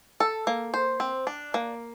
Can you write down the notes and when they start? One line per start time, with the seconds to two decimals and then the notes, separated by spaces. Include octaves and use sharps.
0.20 A4
0.47 A#3
0.74 C5
1.00 C4
1.27 D4
1.54 A#3